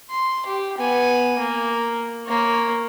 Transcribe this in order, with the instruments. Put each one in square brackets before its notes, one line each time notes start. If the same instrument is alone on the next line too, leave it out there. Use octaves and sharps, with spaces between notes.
[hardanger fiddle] C6
G4
B3 G#5
A#3
A#3 C#5